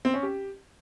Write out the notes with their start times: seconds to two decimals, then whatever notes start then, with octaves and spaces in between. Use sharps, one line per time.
0.05 C4
0.14 C#4
0.23 G4